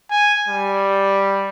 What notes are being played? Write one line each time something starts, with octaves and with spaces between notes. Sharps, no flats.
G#5
G3